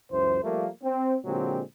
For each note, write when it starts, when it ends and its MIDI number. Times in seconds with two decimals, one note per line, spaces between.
0.11 0.39 37
0.11 0.39 42
0.11 0.39 52
0.11 0.39 72
0.43 0.67 53
0.43 0.67 55
0.43 0.67 57
0.43 0.67 58
0.83 1.15 60
1.25 1.61 46
1.25 1.61 50
1.25 1.61 54
1.25 1.61 56
1.25 1.61 60
1.25 1.61 67